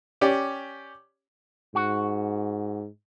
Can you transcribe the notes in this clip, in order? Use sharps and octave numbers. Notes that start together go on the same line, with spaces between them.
C#4 G4 D5
G#2 F#4